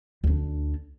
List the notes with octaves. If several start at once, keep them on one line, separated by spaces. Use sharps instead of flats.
D2 D4